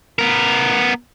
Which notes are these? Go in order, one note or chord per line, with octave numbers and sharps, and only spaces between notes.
B3 A#4